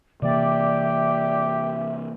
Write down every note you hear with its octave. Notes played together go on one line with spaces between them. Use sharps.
C3 E3 A#3 G4 D5 E5